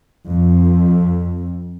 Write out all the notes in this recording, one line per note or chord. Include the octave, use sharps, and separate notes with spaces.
F2